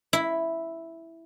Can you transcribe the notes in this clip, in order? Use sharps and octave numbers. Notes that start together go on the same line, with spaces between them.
E4